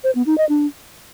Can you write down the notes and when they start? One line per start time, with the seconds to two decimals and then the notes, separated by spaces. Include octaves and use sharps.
0.04 C5
0.15 B3
0.26 D#4
0.38 D#5
0.49 D4